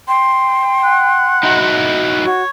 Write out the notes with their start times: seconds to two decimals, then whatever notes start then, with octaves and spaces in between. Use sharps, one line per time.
0.08 G5 C6
0.84 F#5
1.43 D#4 E4 F#4
2.25 F#4 C#5